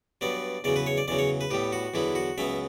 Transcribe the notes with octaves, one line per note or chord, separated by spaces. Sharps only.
G2 F#3 B3 D5
E2 C#3 F#3 D5
B4
C#5
D5
E2 C#3 F#3 D5
C#5
B4
A2 G3 B3 G4
F#4
E2 D3 F#3 B3 E4
F#4
C#2 C#3 F#3 B3 E5